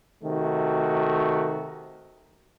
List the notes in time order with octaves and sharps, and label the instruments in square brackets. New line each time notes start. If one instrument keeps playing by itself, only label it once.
[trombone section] C3 D#3 A3 F#4